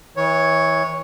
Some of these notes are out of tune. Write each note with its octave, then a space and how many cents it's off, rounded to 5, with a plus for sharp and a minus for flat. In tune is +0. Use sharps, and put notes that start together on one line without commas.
E3 -30 C#5 +0